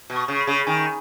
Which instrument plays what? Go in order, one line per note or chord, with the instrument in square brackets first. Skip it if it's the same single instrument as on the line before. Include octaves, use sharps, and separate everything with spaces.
[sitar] B2
[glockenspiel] C#6
[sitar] C#3
[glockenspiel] C#6
B5
[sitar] C#3
[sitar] D#3 [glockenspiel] G#5